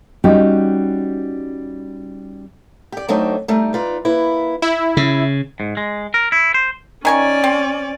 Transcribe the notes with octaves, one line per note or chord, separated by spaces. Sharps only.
G3 C#4 D#4 F#4 G4
G4 D5
F#3 A3 C4 D4 D#4
G3 A3 D#4
D#4 F4 B4 D5
A#3 E4 B4
E4
C#3
G#2
G#3
A#4
E4
C5
D#3 C#4 D5 G#5 C#6
C4